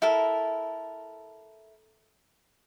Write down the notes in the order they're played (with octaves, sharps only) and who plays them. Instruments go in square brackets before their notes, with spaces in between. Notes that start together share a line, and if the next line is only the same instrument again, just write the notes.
[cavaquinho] E4 A4 A#4